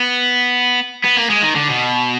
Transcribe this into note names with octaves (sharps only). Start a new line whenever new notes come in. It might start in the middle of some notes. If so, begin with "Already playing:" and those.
Already playing: B3
B3
A#3
G#3
D#3
D3
B2